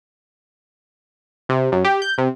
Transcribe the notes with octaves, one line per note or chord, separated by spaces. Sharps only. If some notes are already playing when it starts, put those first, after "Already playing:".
C3
F#2
G4
G6
C3